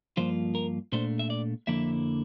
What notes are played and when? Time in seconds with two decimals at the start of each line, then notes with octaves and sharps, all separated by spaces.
0.17 G2 F3 A#3 F4 C5
0.55 A#4
0.93 A#2 A3 D4 C5
1.19 E5
1.30 D5
1.67 F2 D3 F3 A#3 E4 E5